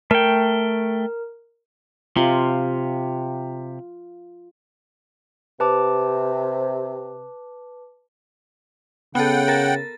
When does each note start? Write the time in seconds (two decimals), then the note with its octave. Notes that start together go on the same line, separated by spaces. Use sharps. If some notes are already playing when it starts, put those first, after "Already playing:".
0.11 A3 A#4 G5
2.17 C3 F4
5.60 C3 B4 A5 D6
9.15 C#3 B3 A4 F#5 G5
9.48 A#4 A6